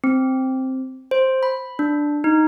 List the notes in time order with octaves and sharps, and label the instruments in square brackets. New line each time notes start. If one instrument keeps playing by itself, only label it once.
[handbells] C4
C5
B5
D4
D#4